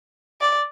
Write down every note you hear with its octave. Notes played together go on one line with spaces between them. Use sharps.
D5